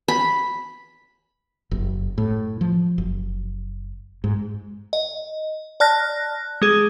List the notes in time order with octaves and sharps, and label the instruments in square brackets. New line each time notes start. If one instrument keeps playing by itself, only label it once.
[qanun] B5
[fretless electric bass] F#1
A2
F3
F#1
G#2
[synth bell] D#5
D5 A5 F6 F#6 A#6
G#3 G#4